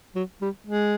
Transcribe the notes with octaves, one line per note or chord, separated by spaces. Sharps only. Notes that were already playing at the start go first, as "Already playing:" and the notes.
F#3
G3
G#3